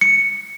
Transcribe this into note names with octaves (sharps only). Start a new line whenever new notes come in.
C#7